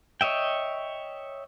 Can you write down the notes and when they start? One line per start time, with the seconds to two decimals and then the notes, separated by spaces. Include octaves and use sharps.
0.21 C#5 D#5 E5 G5